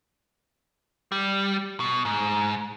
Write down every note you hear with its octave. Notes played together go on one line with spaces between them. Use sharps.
G3
B2
G#2